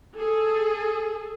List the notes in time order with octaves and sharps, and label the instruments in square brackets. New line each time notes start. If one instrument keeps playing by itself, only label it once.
[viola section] G#4 A4